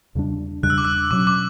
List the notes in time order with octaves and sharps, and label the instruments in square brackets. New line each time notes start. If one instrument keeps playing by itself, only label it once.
[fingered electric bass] E2 C#3 G3 D4
[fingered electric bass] E2 C#3 G3 D4 [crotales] F#6
[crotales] E6
D6
E6
[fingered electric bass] B2 F#3 C#4 [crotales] D6
[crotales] D6